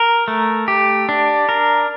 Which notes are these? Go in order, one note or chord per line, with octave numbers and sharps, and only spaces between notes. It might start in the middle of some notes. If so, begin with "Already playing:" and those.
Already playing: A#4
A3
G4
D4
A#4